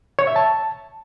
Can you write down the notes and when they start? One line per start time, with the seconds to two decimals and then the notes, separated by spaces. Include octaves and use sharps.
0.19 C#5
0.27 E5
0.36 A5